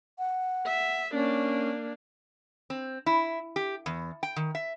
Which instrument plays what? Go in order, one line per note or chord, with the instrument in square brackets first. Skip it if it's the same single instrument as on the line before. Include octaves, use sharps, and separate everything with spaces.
[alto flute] F#5
[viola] E5
[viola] A#3 D4 [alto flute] C#4
[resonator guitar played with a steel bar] C4
E4
G4
E2
G5
D#3
E5